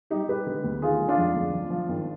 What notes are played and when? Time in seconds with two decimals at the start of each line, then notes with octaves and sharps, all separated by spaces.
0.10 G3 D#4 G4
0.28 G#3 G4 B4
0.46 D3
0.64 D2
0.82 D#3 F4 G#4
1.00 G#3
1.08 D4 F4
1.18 F2
1.35 D2
1.53 F3
1.70 F3
1.89 G#1